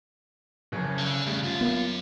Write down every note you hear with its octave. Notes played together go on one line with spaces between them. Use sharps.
F#1 F2 C#3
D3
E2 G3 A3
F#2 F4
A#3 B3